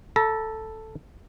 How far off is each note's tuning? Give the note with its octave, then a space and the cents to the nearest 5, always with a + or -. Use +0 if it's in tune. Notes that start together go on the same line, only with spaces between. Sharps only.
A4 +0 A#5 +40